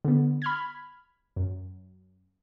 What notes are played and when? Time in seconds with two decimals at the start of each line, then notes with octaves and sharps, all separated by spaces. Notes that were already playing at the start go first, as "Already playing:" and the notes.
0.05 D3 B3
0.42 B5 F6 G#6
1.36 F#2